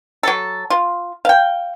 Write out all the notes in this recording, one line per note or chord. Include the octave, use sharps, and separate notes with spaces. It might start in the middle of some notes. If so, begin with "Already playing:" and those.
F#3 A4
F4
F5 G5